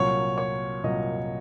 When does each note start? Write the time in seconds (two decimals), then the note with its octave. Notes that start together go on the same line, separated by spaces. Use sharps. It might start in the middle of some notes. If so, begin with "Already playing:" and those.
Already playing: C2 A#2 F#3 C#5
0.38 C#5
0.84 C2 A#2 F#3 D#5